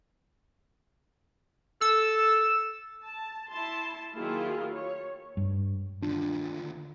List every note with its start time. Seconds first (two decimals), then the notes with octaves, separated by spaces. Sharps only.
1.81 A4 E6
3.02 A5
3.51 E4 A5 C6
4.14 D#3 F#3 A#3 E4 F4 G#4
4.74 C#5
5.37 G2
6.02 D#2 D3 D4 F4